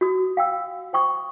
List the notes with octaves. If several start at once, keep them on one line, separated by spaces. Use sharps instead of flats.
F#4 D#6
F5 G5 E6
C5 G5 C#6 D#6